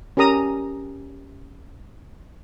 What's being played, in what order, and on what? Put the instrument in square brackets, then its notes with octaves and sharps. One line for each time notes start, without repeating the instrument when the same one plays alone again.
[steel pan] C#4 G4 A#4 A#5 D#6